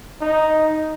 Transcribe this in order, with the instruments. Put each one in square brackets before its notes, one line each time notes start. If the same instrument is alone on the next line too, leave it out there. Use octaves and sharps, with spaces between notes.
[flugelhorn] D#4